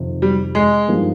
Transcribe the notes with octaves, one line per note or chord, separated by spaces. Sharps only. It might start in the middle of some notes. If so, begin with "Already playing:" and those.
Already playing: F2 C3 D#3
G3
G#3
G2 F3 A#3 D#4 G4